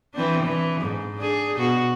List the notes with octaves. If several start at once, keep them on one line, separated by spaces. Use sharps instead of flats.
E3 C4 D4
E3
G#2
D4 G#4
B2 F#4